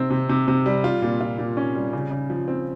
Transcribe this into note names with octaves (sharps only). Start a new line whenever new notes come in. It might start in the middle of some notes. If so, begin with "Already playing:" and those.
Already playing: C3 C4
C3
C3
C3
G3
F4
A#2
F4
A#2
C#4
G3
C#3
C#3
F3
C4